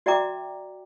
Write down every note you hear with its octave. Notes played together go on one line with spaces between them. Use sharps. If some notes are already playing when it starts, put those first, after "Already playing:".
F#4 D5 E5 G5 A#5 D6